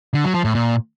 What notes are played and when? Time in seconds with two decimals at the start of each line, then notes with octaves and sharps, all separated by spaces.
0.14 D3
0.24 F#3
0.34 F3
0.45 A2
0.55 A#2